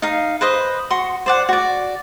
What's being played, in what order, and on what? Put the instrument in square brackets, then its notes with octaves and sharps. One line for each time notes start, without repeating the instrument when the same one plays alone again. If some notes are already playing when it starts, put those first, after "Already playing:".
[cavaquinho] D#4 F5
B4 C5 D#5
F#4 C6 C#6
C5 D5 F#5
F#4 D5